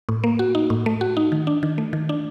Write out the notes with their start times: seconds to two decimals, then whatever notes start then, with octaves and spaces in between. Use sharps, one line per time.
0.09 A2
0.24 A#3
0.39 F#4
0.55 D#4
0.70 A2
0.86 A3
1.01 F#4
1.17 D#4
1.32 D#3
1.47 D4
1.63 D#3
1.78 A3
1.93 D#3
2.09 D4